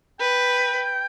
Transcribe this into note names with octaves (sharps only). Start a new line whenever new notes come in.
B4 G5